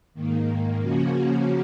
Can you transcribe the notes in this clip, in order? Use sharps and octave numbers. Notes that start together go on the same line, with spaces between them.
G#2 D#3 A#3
C#3 F3 A#3 C#4 F#4